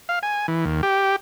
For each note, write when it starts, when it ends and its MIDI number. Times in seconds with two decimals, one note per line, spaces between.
0.09 0.19 77
0.23 0.47 80
0.48 0.65 52
0.65 0.81 39
0.83 1.16 67